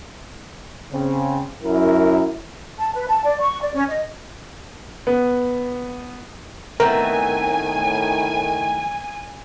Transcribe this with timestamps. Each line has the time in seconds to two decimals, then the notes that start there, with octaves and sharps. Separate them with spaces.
0.93 C#3 C4
1.63 F#2 E4 A#4
2.78 A5
2.94 B4
3.07 A5
3.25 D5
3.40 C#6
3.61 D5
3.74 C#4
3.89 D#5
5.07 B3
6.80 A2 D#3 A3 B3 C4 A#4 G#5